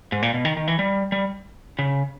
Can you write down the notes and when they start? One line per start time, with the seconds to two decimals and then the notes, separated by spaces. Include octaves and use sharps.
0.12 G#2
0.22 A#2
0.34 B2
0.45 D#3
0.57 D#3
0.67 E3
0.79 G3
1.12 G3
1.79 C#3